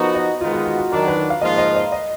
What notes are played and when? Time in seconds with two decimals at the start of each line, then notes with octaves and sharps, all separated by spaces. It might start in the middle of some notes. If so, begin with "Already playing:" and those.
Already playing: F3 B3 D#4 F#4 A#4
0.15 D#5
0.40 D#3 G#3 B3 D#4 F4
0.53 F4
0.66 F#4
0.79 F#4
0.91 D#3 F#3 D4 A#4
1.08 B4
1.30 F5
1.41 G#2 F3 A#3 F4 D#5
1.58 D#5
1.75 D#5
1.92 D#5